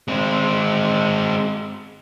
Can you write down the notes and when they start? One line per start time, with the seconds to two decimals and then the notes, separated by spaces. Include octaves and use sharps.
0.08 G#3 C4